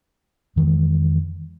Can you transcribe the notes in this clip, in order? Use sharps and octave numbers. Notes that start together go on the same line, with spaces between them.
F2 D#3 E3 G#3